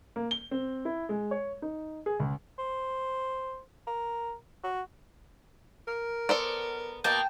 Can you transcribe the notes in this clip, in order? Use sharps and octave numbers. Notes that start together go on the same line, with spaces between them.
A#3
G7
C4
E4
G#3
C#5
D#4
G#4
C#2
C5
A#4
F#4
A#4
B3 A4 C5 D5
B2 A#3 G5 A5